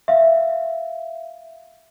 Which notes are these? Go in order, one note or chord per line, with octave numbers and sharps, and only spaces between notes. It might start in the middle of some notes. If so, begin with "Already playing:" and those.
E5 F5